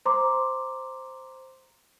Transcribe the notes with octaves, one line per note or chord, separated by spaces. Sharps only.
C5 A#5 C6 D6